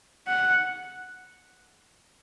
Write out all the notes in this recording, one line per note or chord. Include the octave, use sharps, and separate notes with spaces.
F#5